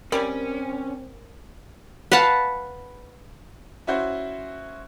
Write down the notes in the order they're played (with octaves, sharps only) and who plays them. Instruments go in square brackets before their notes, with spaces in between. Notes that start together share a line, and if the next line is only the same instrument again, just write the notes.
[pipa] G3 G4 G#5 [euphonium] C4 [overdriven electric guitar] C#4 [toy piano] A#4
[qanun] B4 F5 F#5 A5
[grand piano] C#4 E4 F#4 C5